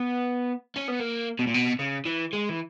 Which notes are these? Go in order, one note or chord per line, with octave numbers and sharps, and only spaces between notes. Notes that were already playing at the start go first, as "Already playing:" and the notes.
Already playing: B3
C#4
B3
A#3
B2
A#2
B2
C#3
E3
G#3
E3